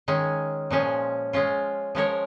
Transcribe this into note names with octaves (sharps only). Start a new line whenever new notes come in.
D#3 G#3 C#4
A#2 F3 G#3 C#4
G#3 C#4 F4
F3 G#3 C#4 A#4 C#5